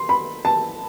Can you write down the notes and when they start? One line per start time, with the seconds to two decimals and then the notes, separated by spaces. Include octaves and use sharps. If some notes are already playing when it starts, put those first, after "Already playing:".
Already playing: C6
0.09 B5
0.45 A5